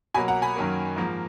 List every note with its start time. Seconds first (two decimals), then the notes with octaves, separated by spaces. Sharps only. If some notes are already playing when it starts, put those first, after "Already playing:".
0.14 B2 F#3 A#3 G#5 B5
0.28 F#5 A#5
0.42 G#5 B5
0.56 F#2 D#3 F#3 A#3
0.97 G#2 F3 A#3